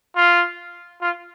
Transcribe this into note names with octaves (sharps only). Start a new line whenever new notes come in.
F4
F4